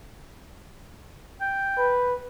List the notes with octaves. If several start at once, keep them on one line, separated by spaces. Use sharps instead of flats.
G5
B4